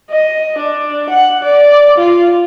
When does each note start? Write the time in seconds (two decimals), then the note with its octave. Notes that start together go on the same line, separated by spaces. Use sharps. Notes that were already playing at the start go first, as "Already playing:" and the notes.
0.10 D#5
0.59 D4
1.10 F#5
1.43 D5
1.98 F4